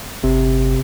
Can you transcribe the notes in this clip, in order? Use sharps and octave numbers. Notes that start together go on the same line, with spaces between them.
G1 C3